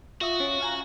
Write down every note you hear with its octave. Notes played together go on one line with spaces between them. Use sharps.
F4 F#4 E5 D#6
C#4
F5 G#5 A#5